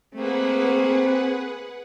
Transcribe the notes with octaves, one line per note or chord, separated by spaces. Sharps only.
A3 A#3 C4 G#4 B4 F#5